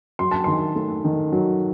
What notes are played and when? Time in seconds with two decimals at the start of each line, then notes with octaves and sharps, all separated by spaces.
0.19 F#3 C6
0.31 A5
0.44 D#3 C6
0.76 A3
1.04 D#3
1.32 F#3